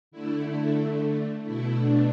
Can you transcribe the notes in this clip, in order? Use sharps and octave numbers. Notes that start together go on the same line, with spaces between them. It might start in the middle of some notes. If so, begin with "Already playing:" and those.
D3 A3 E4
E4
B2 A3 E4
D4